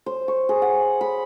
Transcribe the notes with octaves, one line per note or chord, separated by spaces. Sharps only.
C5
C#6
G#4
F#5
B5